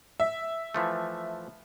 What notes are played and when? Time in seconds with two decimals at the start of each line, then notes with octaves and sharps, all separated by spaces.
0.20 E5
0.74 E3 F3 A3